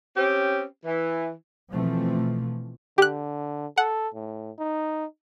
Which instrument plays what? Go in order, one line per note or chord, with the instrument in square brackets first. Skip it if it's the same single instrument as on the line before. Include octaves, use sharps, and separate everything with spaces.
[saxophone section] C4 C#4 G4
E3
[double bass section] B2 E3 F3 A3 C4
[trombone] D3 [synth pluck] G4 F#6
[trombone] A4 [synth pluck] F#5
[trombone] A2
D#4